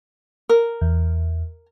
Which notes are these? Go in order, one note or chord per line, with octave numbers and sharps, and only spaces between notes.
A#4
E2